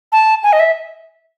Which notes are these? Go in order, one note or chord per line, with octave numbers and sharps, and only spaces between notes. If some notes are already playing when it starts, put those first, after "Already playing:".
A5
G#5
D#5
E5